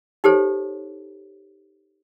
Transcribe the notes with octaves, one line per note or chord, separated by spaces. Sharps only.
D#4 G4 A4 C5 C#5